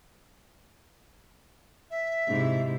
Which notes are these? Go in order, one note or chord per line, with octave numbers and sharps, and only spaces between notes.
E5
G#2 C3 E4